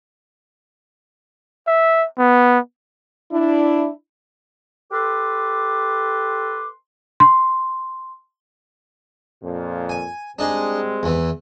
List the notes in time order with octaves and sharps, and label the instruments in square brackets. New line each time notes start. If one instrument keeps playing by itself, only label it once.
[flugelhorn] E5
B3
[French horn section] D4 E4
[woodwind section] G4 A4 B4 C6 D6
[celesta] C6
[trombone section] F2 A#2
[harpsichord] G#5
[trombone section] G3 G#3 C4 [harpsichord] D4 D#4 G#4
[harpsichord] E2 E3